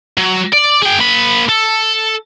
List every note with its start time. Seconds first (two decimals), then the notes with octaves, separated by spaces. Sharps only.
0.18 F#3
0.53 D5
0.82 G#4 G5
0.98 A#3 B5
1.49 A4